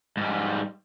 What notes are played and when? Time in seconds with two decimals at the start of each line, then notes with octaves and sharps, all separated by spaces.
0.17 G#2 G3